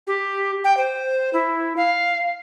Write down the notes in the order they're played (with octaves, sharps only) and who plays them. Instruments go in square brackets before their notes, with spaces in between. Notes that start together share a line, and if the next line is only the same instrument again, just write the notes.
[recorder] G4
G5
C5
E4
F5